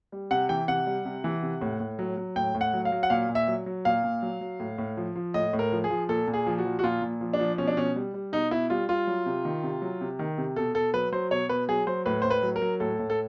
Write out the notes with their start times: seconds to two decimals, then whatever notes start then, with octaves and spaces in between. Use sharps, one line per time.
0.12 G3
0.31 C3 F#5
0.49 E3 G5
0.68 C3 F#5
0.87 G3
1.05 C3
1.24 E3
1.43 C3
1.61 A2
1.80 A2
1.99 F#3
2.17 F#3
2.36 A2 G5
2.55 A2
2.61 F#5
2.73 F#3
2.85 F5
2.92 F#3
3.03 F#5
3.10 A#2 F5
3.29 A#2
3.35 E5
3.48 F#3
3.66 F#3
3.85 A#2 F5
4.04 A#2
4.22 F#3
4.41 F#3
4.60 A2
4.78 A2
4.97 F3
5.16 F3
5.34 A2 D#5
5.53 A2
5.59 A#4
5.72 F3
5.84 G#4
5.90 F3
6.09 A#2 A4
6.28 A#2
6.34 G#4
6.47 F3
6.58 F#4
6.65 F3
6.79 F#4
6.83 A#2 F4
7.02 A#2
7.21 F3
7.33 D4
7.39 F3
7.58 B2 C#4
7.68 D4
7.77 B2 C#4
7.96 G3
8.14 G3
8.32 B2 D#4
8.51 B2 E4
8.70 G3 F4
8.89 G3 F4
9.07 F#3
9.26 C3
9.45 D#3
9.63 C3
9.82 F#3
10.01 C3
10.19 D#3
10.38 C3
10.56 B2 A4
10.75 B2 A4
10.94 F#3 B4
11.12 F#3 C5
11.31 B2 C#5
11.49 B2 B4
11.68 F#3 G#4
11.87 F#3 C5
12.06 A2 B4
12.22 A2 C5
12.30 B4
12.43 F#3
12.56 A#4
12.62 F#3
12.80 A2 A4
12.99 A2
13.10 A4